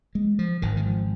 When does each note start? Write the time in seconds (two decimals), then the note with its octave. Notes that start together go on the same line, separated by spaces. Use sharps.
0.15 G#3
0.39 F3
0.62 G#1 G#2 D#3
0.77 D#3
0.86 F3